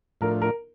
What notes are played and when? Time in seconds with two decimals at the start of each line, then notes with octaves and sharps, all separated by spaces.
0.21 A2 F3 A3 D4 F4 A#4
0.42 A#4